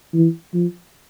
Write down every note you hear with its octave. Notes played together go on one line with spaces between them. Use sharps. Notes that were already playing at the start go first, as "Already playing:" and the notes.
E3
F3